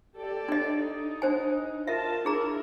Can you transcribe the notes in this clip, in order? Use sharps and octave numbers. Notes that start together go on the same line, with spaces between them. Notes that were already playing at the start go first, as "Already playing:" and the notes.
G4 A4 D5
D4 D#5
D#4
D4 C5 G#5
F4 A#4 D#5 E5 A5
D4 E4 G#4 A#4 A#5